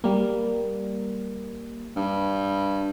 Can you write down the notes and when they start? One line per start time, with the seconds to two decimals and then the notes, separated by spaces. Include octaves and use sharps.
0.04 G3 A#3
1.96 G2